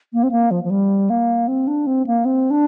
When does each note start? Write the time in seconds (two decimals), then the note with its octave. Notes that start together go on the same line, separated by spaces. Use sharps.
0.13 A#3
0.23 C4
0.31 A#3
0.51 F3
0.64 F3
0.70 G3
1.10 A#3
1.48 C4
1.67 D4
1.87 C4
2.07 A#3
2.25 C4
2.51 D4